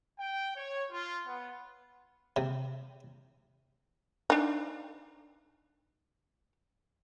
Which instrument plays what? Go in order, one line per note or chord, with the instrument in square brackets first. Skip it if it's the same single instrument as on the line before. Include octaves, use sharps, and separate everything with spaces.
[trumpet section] G5
C#5
F4
B3
[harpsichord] C3
[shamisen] D4 D#4